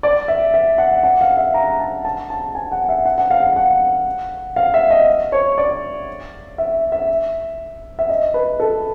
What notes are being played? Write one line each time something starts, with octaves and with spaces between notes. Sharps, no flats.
D5
E5
E5
F#5
F#5
F5
E5
A#5
A5
A5
A5
G#5
F#5
E5
F#5
F#5
F5
F5
F#5
F5
E5
D#5
C#5
D5
E5
E5
E5
D#5
B4
A4